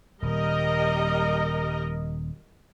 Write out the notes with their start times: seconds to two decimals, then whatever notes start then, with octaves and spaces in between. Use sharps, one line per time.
0.22 D#1 G3 A#4 D#5